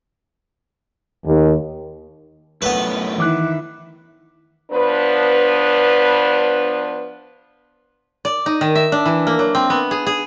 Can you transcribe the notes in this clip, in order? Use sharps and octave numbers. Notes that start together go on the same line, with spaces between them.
D#2
F#2 A2 A3 B3 B4
D#3 E3 E4 D6 F#6
F3 B3 D4 B4
D5
D#4
D#3
E5
D4
E3
A#3
F#3
C4
B3
G#4
G#4